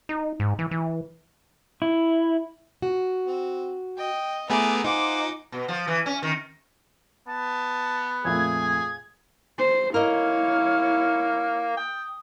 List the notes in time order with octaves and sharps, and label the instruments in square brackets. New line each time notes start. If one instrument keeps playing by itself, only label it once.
[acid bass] D#4
G#2
E3
E3
[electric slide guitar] E4
[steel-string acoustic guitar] F#4
[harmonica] C4
[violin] D#5 [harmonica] G5
[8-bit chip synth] A3 B3 G#4 [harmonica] E4 B4 G#5 [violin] A#5 D6
[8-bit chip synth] D#4 [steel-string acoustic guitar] F4 [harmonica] C5 F#5 G#5 [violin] D6
[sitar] B2
F3
E3
C#4
D#3
[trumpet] B3 [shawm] A5
[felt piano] F2 A#2 A3 [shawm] G#4 [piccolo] G#6
[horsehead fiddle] C5
[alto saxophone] A#3 [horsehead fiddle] E4 C#5 [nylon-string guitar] A#4 D#5 [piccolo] F6
[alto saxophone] G5 [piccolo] D#6